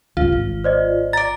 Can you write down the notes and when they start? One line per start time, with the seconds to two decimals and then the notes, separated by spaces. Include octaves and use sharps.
0.17 C#2 G2 F4
0.32 G#1
0.64 C5 D5 D#5
1.13 D5 A#5 A6